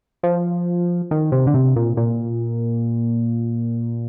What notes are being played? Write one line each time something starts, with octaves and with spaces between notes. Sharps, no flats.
F3
D#3
C3
D3
C3
A#2
A#2